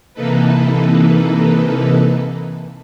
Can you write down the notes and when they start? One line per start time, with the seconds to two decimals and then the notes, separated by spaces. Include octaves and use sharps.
0.14 C3 E3 A#3 D#4 A4 B4